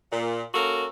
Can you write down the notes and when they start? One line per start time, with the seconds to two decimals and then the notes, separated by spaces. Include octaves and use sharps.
0.11 A#2
0.54 A#3 C#4 F#4 A4 A#4